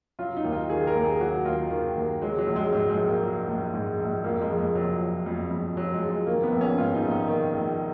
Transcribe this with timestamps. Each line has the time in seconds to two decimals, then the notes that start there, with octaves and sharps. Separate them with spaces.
0.19 F#3 F4
0.37 D#4
0.44 D#2
0.52 F4
0.69 D#3 G#4
0.87 A#4
0.95 D#2
1.04 G#4
1.21 F#3 F#4
1.45 D#2 F4
1.70 D#3
1.96 D#2
2.22 F#3 G#3
2.38 F#3
2.47 A#1
2.56 G#3
2.72 G#2 F#3
2.90 G#3
2.97 A#1
3.06 A#3
3.23 F#3
3.48 A#1
3.73 G#2
4.00 A#1
4.24 F2 A#3
4.41 G#3
4.50 F2
4.58 G#3
4.75 F3 F#3
5.00 F3
5.26 F2
5.51 F2
5.76 F3 F#3
5.94 G#3
6.02 F3
6.10 G#3
6.26 D#3 A#3
6.43 B3
6.53 A#1
6.61 C#4
6.78 G#2 F4
6.94 D#4
7.03 A#1
7.11 D#4
7.28 D#3
7.54 A#1